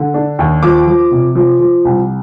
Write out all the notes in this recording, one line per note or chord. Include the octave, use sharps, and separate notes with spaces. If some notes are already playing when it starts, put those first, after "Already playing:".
Already playing: D3
D4
D#2
F3 D6
F3
C3
F3
F3
C2